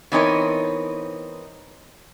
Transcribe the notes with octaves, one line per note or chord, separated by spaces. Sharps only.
E3 B3 C4 D#4 A#4 C#5